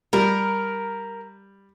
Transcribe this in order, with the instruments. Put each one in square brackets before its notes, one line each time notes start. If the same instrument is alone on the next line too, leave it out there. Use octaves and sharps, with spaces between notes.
[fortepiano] G3 [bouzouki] A#4